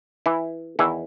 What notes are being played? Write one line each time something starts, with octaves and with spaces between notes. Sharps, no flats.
E3 E4
E2 D#3 E3 E4